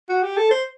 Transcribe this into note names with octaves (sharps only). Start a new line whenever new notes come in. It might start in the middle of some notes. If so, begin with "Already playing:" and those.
F#4
G4
A4
C5